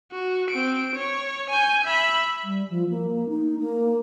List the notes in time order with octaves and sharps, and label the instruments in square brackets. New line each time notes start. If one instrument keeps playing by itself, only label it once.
[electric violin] F#4
C4 D7
C#5
G#5 G6
E5 B5
[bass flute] G3
F3
A#3
D#4
A#3